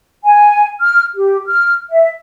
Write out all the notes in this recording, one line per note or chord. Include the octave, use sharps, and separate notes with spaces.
G#5
F6
G4
F6
E5